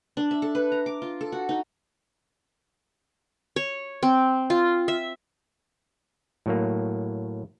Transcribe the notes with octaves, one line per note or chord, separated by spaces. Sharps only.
D4
E5
A4
B4
A#5
D6
F4
A4
F#4
D#4
C#5
C4
F4
E5
A2 F#3 A#3